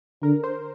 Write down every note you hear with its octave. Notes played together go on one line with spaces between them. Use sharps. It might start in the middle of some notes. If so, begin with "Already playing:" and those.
D3 A#4
C5